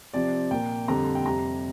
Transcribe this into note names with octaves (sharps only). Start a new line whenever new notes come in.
C3 F3 C4 D5
A#2 A#3 G5
F2 D3 G3 C4 A#5
G5
F2 C3 G3 A#5